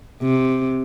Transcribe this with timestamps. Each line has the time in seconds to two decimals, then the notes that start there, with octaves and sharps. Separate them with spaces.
0.21 C3